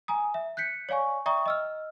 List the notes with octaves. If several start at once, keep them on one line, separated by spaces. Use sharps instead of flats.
G#5 A#5 D#6
E5
F#6 G6 B6 C#7
C#5 D5 F5 G#5 C#6
D5 E5 G5 A#5 C#6 D#6
D#5 E6 F6